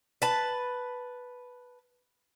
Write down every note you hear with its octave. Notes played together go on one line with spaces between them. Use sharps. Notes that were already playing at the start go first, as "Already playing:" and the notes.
B4 A5